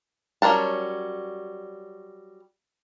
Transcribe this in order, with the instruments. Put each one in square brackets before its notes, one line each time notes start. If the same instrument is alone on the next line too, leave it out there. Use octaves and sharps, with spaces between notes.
[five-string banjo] F#3 G3 C#4 A#4 A5